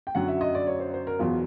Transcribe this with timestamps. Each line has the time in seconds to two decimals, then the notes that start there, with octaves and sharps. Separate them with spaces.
0.07 G5
0.15 F#2 D3 F#3 F#5
0.28 E5
0.41 D#5
0.55 D5
0.67 C#5
0.80 C5
0.94 C5
1.07 A#4
1.19 E2 B2 F#3 F4